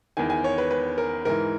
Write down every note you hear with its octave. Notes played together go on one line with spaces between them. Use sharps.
E2 D#3 G#5
G#5
C#5
B4
B4
A#4
G#2 E3 A#4